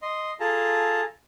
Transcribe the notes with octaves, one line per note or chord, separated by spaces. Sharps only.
D#5 C6
F4 G#4 A4 A5 A#5